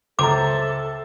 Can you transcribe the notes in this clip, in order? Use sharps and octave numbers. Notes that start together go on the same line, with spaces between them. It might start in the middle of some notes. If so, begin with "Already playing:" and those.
C#2 A4 C5 E5 A#5 D6